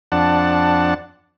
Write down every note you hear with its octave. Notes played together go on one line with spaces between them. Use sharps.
F2 D4 F#5 A5